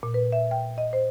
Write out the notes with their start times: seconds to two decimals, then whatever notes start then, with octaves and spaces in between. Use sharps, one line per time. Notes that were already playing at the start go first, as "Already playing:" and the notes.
0.03 A#2
0.14 B4
0.32 E5
0.51 G5
0.78 D#5
0.93 C5